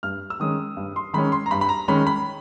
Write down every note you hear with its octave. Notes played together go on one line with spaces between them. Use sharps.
G2 F6
E6
D#3 G#3 C#4 D#6
G2
C6
D#3 G#3 C#4 B5
C6
A#5
G2 B5
B5
A#5
D#3 G#3 C#4 B5
B5